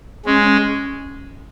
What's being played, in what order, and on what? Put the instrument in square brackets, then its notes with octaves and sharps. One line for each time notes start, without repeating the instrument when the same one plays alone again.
[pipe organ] G#3 [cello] C#4